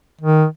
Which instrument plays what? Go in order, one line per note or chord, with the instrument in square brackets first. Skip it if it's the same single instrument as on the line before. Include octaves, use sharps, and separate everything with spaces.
[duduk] D#3